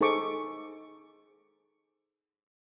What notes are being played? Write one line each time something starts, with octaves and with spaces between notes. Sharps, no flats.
D#4 G#4 A4 C5 C#6 D6